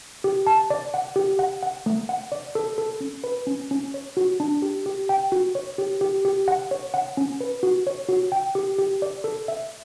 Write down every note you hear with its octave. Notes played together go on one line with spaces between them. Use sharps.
G4
A5
D5
F#5
G4
F#5
F#5
A3
F#5
D5
A4
A4
C#4
B4
C#4
C#4
C#5
F#4
D4
G4
G4
G5
F#4
C#5
G4
G4
G4
F#5
C#5
F#5
C#4
B4
F#4
C#5
F#4
G5
G4
G4
D5
A4
E5